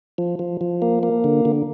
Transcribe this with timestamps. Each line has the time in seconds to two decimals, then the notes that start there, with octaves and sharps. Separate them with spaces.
0.18 F3
0.39 F3
0.61 F3
0.82 A#3
1.03 A#3
1.24 D3
1.45 D3